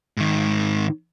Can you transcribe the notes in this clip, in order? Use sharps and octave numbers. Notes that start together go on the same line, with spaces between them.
G#2 D#3